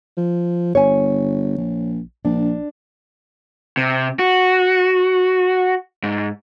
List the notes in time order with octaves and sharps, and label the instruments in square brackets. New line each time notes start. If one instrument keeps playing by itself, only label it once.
[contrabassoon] F3
[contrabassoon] G1 [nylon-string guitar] C#5 G#5
[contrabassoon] A#1
[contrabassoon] A#1 [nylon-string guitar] D4
[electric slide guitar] C3
F#4
G#2